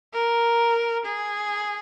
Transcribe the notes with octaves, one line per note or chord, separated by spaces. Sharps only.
A#4
G#4